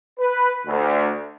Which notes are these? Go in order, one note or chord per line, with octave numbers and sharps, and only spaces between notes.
B4
D2